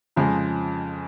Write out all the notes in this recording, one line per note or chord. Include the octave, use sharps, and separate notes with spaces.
F2 C#3 F3 G#3